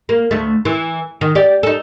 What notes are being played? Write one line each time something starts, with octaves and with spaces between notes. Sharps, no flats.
A#3
D2 A3
E3
D#3
G4 D5
D#4 A4